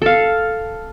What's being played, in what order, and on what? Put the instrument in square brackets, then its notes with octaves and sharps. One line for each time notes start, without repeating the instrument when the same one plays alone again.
[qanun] A4 F5